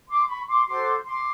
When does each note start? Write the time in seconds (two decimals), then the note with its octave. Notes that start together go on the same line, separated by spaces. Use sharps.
0.09 C6 D6
0.28 B5 C#6
0.48 C6 D6
0.67 F#4 A4 C5 C6 D6
1.06 C6 D6